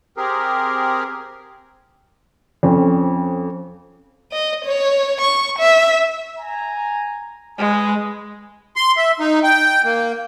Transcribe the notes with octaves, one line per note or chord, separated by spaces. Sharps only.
C4 G4 G#4 A#4
F2 C4 C#4
D#5
C#5
C#6
E5
G#5 A#5
G#3 G#4 B4 G#5
C6
E5
D#4
G5
A#3